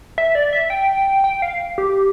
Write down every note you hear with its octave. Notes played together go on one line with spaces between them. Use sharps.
E5
D5
E5
G5
G5
F5
G4